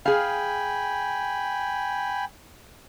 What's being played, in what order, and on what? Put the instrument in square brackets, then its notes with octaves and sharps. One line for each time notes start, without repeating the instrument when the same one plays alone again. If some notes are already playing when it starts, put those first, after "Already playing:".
[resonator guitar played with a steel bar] G#4 F5 [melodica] G5 G#5 B5